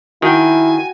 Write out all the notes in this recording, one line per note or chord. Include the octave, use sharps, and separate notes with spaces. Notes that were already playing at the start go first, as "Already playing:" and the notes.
D#3 E4 F#4 G5 G#5